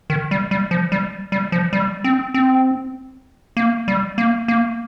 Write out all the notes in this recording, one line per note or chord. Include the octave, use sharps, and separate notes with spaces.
D#3
G3
G3
F3
G3
G3
F3
G3
C4
C4
A#3
G3
A#3
A#3